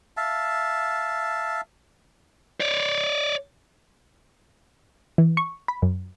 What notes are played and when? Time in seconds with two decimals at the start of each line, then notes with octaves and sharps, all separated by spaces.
0.17 E5 F5 A5
2.60 C#5 D5
5.18 E3
5.37 C#6
5.68 B5
5.82 F#2